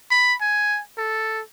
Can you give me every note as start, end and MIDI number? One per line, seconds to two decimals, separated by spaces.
0.11 0.34 83
0.41 0.81 80
0.98 1.41 69